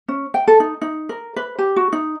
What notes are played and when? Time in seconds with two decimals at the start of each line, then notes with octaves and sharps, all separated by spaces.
0.08 C#4
0.34 G5
0.47 A4
0.60 D#4
0.82 D#4
1.09 A#4
1.36 B4
1.59 G4
1.76 F#4
1.93 D#4